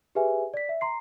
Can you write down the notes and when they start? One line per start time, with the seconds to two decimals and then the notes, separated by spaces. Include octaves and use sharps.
0.15 G4 G#4 B4 E5 G#5
0.54 D5 B6
0.69 E5
0.81 A#5 C6 C7